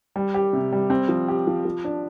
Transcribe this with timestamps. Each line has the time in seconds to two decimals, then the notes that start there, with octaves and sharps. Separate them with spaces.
0.16 G3
0.34 G4
0.53 C3
0.72 G3
0.90 C4
1.09 F3
1.28 G4
1.47 F3
1.65 F3
1.84 D4